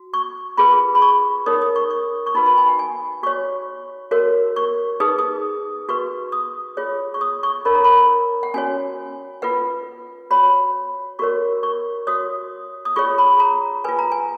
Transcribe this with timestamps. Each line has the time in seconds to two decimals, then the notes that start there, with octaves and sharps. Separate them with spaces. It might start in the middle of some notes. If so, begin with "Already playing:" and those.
Already playing: F#4
0.14 C#6
0.57 F4 G#4 B4 B5
0.95 B5
1.02 C#6
1.46 D#4 A#4 C#5 D#6
1.62 D#6
1.76 C#6
1.90 C#6
2.26 C#6
2.35 D#4 F#4 B4 B5
2.46 B5
2.57 G#5
2.68 F#5
2.79 G#5
3.23 F#4 C#5 C#6
4.11 F#4 A#4 C#5
4.56 C#6
5.00 D#4 G#4 B4 D#6
5.18 D#6
5.89 F#4 B4 C#6
6.32 D#6
6.77 F4 G#4 C#5
7.14 C#6
7.21 D#6
7.43 C#6
7.65 D#4 A#4 C#5 B5
7.75 A#5
7.84 B5
8.43 F#5
8.54 C#4 F#4 C#5 G#5
9.42 F4 B4 F#5
10.31 F#4 C#5 B5
11.19 F#4 A#4 C#5 C#6
11.63 C#6
12.07 F#4 C#5 D#6
12.85 D#6
12.96 F4 G#4 C#5 C#6
13.18 B5
13.40 A#5
13.84 F4 B4 G#5
13.99 A#5
14.12 G#5